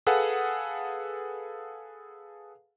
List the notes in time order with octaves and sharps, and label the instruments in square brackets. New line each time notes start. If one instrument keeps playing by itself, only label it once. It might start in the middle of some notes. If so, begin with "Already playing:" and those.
[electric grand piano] G#4 A4 B4 F5 F#5